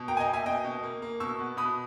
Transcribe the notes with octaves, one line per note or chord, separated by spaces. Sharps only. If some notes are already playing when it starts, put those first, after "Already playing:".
Already playing: B2
A#3 G5 A#5
G#5
D#5 G5
A#3
E5 G#5
B2 D#5 G5
B2
A#3
A#3
B2 C#6 E6
B3
B2 B5 D#6